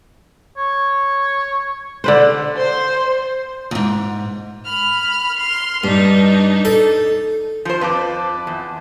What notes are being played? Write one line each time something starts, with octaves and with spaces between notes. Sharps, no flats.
C#5
D3 B4 C5
C5
E2 G#2
B5 F6
C6 F6
G2 D4 D#4
A4
F3 C5
F2 B4 A5 D6
E2